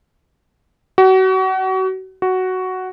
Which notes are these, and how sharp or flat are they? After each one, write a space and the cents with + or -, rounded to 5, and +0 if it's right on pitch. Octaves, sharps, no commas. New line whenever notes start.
F#4 +30
F#4 +5